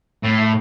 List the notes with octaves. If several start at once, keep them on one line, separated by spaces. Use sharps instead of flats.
A2